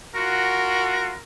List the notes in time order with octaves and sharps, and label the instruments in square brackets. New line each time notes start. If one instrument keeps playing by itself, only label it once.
[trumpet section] F4 F#4 [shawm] A#4